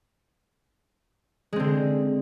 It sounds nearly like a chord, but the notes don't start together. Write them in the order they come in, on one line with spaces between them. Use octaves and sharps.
G#3 C4 D3